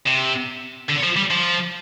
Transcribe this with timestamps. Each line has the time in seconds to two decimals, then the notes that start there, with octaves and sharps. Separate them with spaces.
0.06 C3
0.89 D3
1.04 F3
1.17 G3
1.31 F3